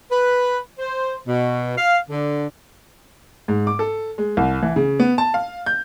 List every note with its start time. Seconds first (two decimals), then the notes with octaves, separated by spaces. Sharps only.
0.11 B4
0.79 C5
1.27 B2
1.77 F5
2.10 D3
3.48 G#2
3.67 D6
3.79 A4
4.18 G#3
4.37 C2
4.62 E3
4.76 C#3
5.00 B3
5.18 A5
5.34 F5
5.66 G6